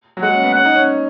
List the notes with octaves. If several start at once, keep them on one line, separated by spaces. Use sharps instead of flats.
F#3
G#3 F#5
C#4
B3
C#4 F#5
D#4
C#4